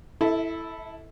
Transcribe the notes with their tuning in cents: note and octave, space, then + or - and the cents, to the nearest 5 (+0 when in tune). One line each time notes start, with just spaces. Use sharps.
E4 +0 A4 +0 E5 -40